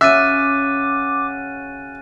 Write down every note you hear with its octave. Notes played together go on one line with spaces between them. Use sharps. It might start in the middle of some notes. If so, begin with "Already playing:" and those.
C#3 C#4 F#4 E5 D6 F#6 A6 D#7